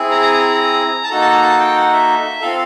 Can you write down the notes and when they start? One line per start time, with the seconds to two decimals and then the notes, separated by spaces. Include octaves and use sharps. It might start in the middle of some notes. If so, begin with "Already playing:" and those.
Already playing: C4 E4 G#4
0.11 A#5
0.22 A#5
0.33 A#5
1.04 A5
1.09 A#3 D#4 F#4 A4 A#5
1.21 A5
1.32 A#5
1.42 A5
1.59 G5
1.76 F#5
1.92 E5
2.41 C4 F4 A4 F5